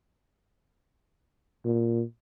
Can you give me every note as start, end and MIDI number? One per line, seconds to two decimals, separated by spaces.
1.65 2.04 46